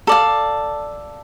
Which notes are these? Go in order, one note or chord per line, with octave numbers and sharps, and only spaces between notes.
A4 D5 F5